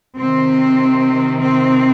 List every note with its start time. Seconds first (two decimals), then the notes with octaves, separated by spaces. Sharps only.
0.17 C3 D#3 C4
1.40 C4